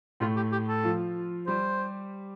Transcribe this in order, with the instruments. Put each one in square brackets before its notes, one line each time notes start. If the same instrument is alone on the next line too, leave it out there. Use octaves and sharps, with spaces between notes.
[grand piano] A2 A3 [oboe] F4
[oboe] G4
G4
A4
[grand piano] F3 F4
[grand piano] G3 G4 [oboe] C5